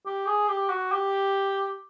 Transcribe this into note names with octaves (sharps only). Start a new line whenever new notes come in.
G4
G#4
G4
F#4
G4